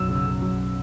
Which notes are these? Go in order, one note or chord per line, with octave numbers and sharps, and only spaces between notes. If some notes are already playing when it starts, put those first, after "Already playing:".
Already playing: B1 F#2 F#3 E6
C#3
C#3
F#3